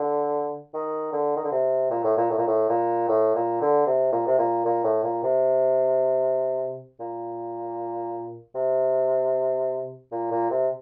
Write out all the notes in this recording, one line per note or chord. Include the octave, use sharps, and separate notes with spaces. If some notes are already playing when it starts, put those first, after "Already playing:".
Already playing: D3
D#3
D3
D#3
D3
C3
A#2
A2
A#2
A2
A#2
A2
A#2
A2
A#2
D3
C3
A#2
C3
A#2
A#2
A2
A#2
C3
A#2
C3
A#2
A#2
C3